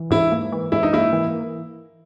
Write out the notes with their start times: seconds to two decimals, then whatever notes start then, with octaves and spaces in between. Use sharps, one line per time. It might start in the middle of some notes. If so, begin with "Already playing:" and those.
Already playing: E3
0.11 G#2 E4
0.32 A#3
0.52 E3
0.72 G#2 E4
0.83 D#4
0.93 A#3 E4
1.13 E3